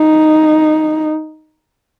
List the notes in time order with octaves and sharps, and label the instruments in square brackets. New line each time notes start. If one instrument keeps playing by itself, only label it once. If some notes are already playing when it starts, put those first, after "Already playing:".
Already playing: [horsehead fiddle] D#4